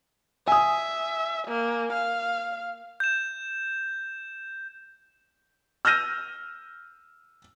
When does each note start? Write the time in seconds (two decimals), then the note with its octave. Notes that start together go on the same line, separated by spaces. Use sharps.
0.48 E5 G#5 D#6
1.48 A#3
1.93 F5
3.00 G6 E7
5.85 E6 F6 G6 A#6 D#7